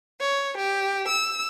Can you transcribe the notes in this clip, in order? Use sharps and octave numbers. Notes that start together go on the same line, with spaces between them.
C#5
G4
E6